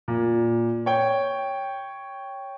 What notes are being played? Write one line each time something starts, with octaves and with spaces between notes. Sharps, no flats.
A#2
C#5 G5